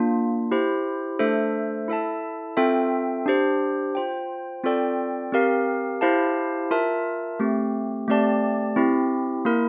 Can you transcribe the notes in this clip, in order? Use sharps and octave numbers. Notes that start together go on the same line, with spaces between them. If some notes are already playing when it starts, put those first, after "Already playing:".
Already playing: A#3 D4 F4
E4 G4 C5
A3 D4 A4 C5 E5
E4 A4 E5 A5
C4 F4 A4 E5 G5
D4 G4 C5
F4 C5 G5
C4 F4 A4 D5 G5
C4 G4 A#4 F5
E4 G4 C5 F5 A5
F4 A#4 E5 A5
A3 C4 G4
A3 C4 G4 D5 A5
C4 E4 G4
A#3 E4 A#4